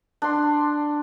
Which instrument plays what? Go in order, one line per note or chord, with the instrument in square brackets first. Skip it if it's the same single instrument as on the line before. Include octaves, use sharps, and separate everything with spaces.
[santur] D4 C6